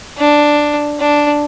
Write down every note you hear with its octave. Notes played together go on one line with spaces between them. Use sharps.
D4
D4